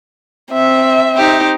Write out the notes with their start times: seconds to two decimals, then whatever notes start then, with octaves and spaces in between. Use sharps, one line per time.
0.53 C4 E5
1.16 D#4 G4 C5